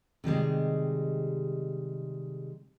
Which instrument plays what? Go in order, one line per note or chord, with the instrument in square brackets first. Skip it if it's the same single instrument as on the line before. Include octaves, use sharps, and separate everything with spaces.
[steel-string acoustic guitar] C3 D#3 G3 G#3